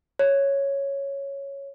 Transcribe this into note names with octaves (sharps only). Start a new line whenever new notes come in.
C#5